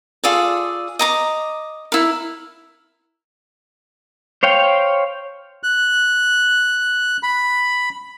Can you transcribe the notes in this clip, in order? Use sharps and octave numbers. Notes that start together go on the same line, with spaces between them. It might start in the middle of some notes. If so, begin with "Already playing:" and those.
F4 G#4 A4 D5
D#5 A#5 D6
E4 A#4
C5 C#5 F5 G5
F#6
B5